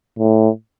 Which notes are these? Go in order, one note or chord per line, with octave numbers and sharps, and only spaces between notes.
A2